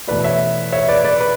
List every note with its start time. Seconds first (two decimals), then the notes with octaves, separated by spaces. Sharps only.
0.07 E2 B2 A3 E4 B4 D5
0.24 C#5 E5
0.72 C#5 E5
0.88 B4 D5
1.05 B4 D5
1.20 B4 D5